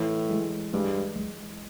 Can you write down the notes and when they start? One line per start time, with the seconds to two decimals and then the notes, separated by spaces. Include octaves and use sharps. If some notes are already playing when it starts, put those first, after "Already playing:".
Already playing: A2 E3
0.30 G#3
0.73 G2 G#3
1.15 G#3